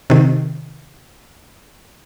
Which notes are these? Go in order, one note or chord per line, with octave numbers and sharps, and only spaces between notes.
C3 D#3